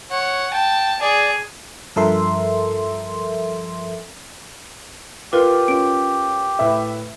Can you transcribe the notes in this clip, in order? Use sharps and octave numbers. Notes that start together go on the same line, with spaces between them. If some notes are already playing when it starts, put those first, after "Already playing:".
C#5 F#5
G5 A5
G#4 D5
G2 F3 A4 A#4 E5 C6
F4 G4 A#4 B4
C#4 F4 D7
A2 B4 E5